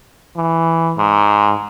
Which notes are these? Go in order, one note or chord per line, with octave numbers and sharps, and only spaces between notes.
E3
G#2